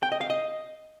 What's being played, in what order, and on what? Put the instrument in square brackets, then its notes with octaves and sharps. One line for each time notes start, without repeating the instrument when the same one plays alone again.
[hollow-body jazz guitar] G5
D#5
F5
D#5